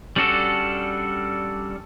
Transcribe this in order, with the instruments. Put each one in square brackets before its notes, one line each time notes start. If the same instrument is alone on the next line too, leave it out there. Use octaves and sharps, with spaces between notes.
[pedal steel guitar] G3 C#4 D4 F#4 A4